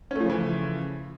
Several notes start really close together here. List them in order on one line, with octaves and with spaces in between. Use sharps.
C#4 A3 F3 C#3 E3